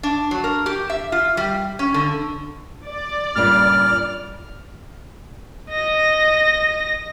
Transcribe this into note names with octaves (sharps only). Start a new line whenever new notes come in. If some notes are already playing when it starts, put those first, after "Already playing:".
D4
F#3
A#4
G4
E5
F4
G3
C#4
D3
D5
G2 A#2 C#3 F6
D#5 A#6